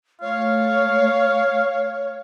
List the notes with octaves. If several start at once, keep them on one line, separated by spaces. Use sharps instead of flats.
A3 C#5 F5